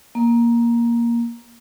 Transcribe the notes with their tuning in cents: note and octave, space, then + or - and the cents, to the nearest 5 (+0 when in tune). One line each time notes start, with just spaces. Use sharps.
A#3 +10